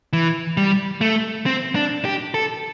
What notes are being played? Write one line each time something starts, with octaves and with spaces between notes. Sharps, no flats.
E3
G3
A3
C4
D4
G4
A4